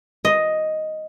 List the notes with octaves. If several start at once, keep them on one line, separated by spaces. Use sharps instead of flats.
D#5